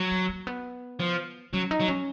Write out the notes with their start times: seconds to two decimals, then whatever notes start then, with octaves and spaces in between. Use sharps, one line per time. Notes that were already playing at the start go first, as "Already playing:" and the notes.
Already playing: F#3
0.11 G#3
0.29 A#3
0.47 B3
1.00 F3
1.53 F#3 C#4
1.71 D#4
1.80 F#3
1.88 C#4